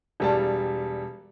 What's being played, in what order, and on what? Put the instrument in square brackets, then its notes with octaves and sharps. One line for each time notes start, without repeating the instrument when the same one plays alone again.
[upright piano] E1 G3 A5